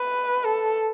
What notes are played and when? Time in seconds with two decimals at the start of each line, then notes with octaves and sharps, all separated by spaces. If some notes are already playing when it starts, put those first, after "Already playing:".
Already playing: B4
0.44 A4